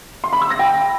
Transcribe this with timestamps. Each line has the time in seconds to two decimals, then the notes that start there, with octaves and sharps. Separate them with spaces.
0.24 C6
0.33 B5
0.41 E6
0.50 A#6
0.59 G5